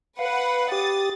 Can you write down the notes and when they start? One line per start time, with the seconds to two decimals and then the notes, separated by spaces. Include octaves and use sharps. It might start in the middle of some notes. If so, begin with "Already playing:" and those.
0.19 B4 F5 F#5
0.72 G4 D#6 A6